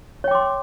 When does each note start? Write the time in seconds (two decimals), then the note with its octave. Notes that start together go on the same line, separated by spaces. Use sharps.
0.24 C#5
0.28 G5
0.31 D6
0.35 C6